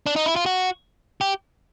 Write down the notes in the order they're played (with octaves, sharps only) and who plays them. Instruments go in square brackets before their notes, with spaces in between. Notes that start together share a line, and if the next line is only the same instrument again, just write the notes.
[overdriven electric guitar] D4
D#4
E4
F4
F#4
G4